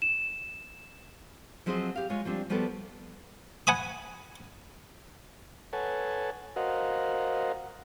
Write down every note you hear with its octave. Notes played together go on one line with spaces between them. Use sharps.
E7
F3 F#3 C4 G#4 C5 D#5
G4 F5
G#3 F4 C#5
F3 G3 C4 D4
F3 G3 B3 F#4 A4
F#5 G#5 B5 D#6
A4 B4 C#5 F#5 G#5 A5
F#4 A#4 C5 D#5 F5 F#5